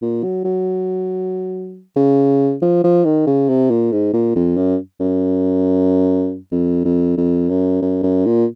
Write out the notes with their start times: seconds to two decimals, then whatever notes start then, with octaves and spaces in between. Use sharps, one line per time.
0.02 A#2
0.24 F#3
0.45 F#3
1.96 C#3
2.62 F3
2.84 F3
3.05 D#3
3.27 C#3
3.49 C3
3.70 A#2
3.92 G#2
4.14 A#2
4.36 F2
4.57 F#2
5.00 F#2
6.52 F2
6.85 F2
7.17 F2
7.50 F#2
7.82 F#2
8.03 F#2
8.26 A#2